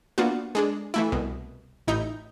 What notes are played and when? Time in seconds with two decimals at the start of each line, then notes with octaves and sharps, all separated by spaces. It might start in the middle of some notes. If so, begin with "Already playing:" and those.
0.18 A#3 B3 D4 F4 F#4
0.55 G#3 D4 G#4
0.94 E3 A3 E4
1.12 C2 B2
1.88 A1 D#4 E4 G6